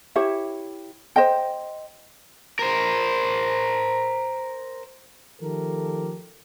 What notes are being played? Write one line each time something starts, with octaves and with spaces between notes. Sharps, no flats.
E4 G4 C#5 E5
C5 D#5 G5
A#4 C5
D#3 F3 A3 G4 A4 A#4